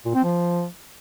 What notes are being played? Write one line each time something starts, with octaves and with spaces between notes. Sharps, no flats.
A#2
C4
F3